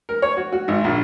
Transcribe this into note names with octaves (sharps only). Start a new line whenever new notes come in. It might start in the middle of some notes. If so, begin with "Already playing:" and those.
A#4
C#5
F#4
F#4
G#1
A#1